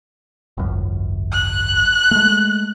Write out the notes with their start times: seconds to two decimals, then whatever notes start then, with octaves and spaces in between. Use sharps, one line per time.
0.57 G#1 C#2 F#2
1.32 F#6
2.11 G#3 A3